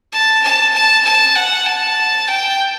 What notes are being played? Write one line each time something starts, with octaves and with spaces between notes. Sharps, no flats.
A5
A5
A5
A5
F#5
A5
G5